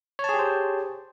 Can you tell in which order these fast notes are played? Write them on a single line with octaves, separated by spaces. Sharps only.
C#5 A5 G#4 G4 C5